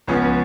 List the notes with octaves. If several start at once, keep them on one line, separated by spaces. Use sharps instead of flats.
C#2 C#3 F3 B3 C#4